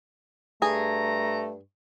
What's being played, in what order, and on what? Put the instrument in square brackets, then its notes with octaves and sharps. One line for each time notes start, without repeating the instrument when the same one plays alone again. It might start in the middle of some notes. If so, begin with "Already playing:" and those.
[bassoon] G2 [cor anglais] A3 [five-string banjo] G#4 [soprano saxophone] A#5